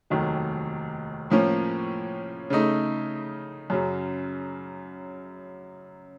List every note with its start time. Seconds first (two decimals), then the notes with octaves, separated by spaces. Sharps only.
0.10 F1 D#2 D#3 F#3
1.30 A2 F3 A#3 C#4
2.50 C#3 A3 D#4
3.70 F#2 C#3 F#3